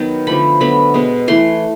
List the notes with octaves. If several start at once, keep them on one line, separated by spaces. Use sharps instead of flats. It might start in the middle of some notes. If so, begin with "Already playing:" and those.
Already playing: D#3 F#3 B3
D3 F3 A3 B5
D3 F#3 B3 B5
B2 G#3 B3
E3 A3 C6